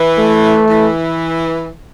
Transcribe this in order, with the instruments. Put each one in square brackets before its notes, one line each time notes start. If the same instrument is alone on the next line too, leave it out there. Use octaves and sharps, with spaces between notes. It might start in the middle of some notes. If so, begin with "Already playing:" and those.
Already playing: [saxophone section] E3
[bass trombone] A3
[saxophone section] E3